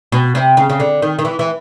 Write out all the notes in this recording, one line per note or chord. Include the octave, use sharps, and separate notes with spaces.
B2
C3
C#3
C#3
D3
D#3
D#3
E3
E3